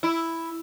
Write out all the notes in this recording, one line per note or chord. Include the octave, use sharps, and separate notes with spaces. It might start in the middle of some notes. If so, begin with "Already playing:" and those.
E4